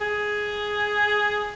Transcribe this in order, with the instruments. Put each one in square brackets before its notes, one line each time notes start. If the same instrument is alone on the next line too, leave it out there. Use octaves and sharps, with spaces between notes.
[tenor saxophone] G#4